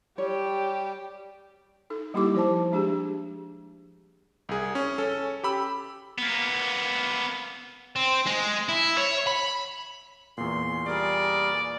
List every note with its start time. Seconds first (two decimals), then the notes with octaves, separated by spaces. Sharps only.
0.18 G3 G4 C#5
1.90 D#4 A4
2.14 G3 A#3 D#4 E4 G4 D6
2.34 F3 C5 A5
2.72 G#3 D4 G4 G#4
4.49 C2 G#4
4.75 C#4
4.98 C#4 A4
5.44 G4 B5 E6
6.18 A#3 B3
7.96 C4
8.26 G#3
8.69 E4
8.98 C#5
9.27 B5
10.38 E2 A#2 C6
10.87 G3 G#4 A#4 D5